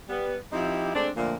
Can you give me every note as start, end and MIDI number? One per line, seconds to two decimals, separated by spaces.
0.08 0.37 55
0.08 0.37 59
0.53 0.90 53
0.53 0.90 60
0.53 0.90 63
0.53 0.90 64
0.53 0.90 67
0.95 1.09 56
0.95 1.09 57
0.95 1.09 60
0.95 1.09 62
1.17 1.36 41
1.17 1.36 46
1.17 1.36 50
1.17 1.36 53
1.17 1.36 57
1.17 1.36 58